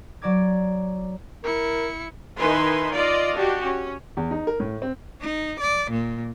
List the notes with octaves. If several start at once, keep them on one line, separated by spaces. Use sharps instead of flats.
F#3 D5 A#5 D6 G#6
E4 A#4 C#7
D#3 D#4 E4 B4 G#5 C6
F4 D5 D#5 F5
D4 F#4 G4
C#4
E2
D#4
A#4
A2
C4
D#4
D5
A#2